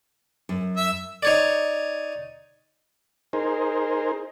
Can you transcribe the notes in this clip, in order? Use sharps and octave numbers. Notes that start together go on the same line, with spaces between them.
F#2
E5
D#4 C#5 D5
D#4 G#4 A#4 C5